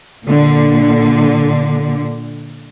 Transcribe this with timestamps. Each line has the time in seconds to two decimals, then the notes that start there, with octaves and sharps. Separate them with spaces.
0.24 A#2 D3